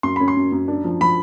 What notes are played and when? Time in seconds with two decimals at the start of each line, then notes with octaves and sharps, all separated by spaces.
0.03 F#2 C6
0.16 C#4 B5
0.28 C6
0.37 F#2
0.52 F#2
0.68 D4
0.84 F3
1.00 F3 B5